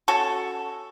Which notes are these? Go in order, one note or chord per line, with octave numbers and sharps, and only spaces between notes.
C#4 F#4 A4